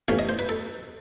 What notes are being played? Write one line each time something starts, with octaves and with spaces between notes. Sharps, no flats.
C3 E3 A3 C#4 F5
D#5
C5
B4
A4